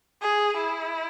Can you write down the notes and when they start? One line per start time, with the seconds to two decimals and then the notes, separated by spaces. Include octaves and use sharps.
0.21 G#4
0.57 E4